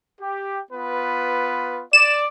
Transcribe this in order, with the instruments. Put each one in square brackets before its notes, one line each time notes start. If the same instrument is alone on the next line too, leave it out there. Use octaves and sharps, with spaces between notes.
[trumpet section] G4
B3 F4 B4
[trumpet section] D5 [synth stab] E7